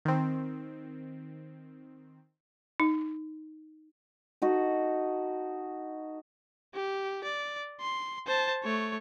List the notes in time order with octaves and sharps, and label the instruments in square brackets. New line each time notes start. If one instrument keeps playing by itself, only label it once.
[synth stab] D#3 C4
[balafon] D#4
[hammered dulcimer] D#4 F#4 A4
[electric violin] G4
D5
C6
C5 A5
A3 C#5